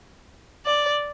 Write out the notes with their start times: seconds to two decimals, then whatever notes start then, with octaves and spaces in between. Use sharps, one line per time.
0.66 D5